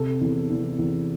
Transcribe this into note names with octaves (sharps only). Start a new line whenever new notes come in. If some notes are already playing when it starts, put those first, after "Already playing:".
Already playing: C3 A4
E2
E2
E2